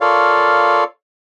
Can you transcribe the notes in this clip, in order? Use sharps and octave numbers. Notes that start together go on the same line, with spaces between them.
F4 A4 A#4 C#5 D5 F5